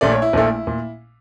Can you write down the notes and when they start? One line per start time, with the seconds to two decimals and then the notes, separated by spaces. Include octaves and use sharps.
0.01 A#1 A#2 A3 D5
0.12 C#5
0.22 E4
0.33 A#1 A#2 A3
0.67 A#2